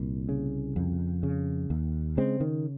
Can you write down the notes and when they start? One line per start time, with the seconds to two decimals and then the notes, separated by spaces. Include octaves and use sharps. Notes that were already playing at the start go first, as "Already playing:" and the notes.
Already playing: C2 A#2 A#3
0.29 C#3
0.76 F2
1.23 C#3
1.70 D#2
2.17 C#3 G#3 C4
2.40 D#3